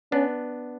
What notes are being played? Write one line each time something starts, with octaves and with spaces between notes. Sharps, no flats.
B3 C#4 D4